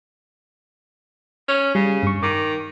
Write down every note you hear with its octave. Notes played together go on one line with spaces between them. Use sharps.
C#4
C#3 G3
G2 C#6
D#3 D6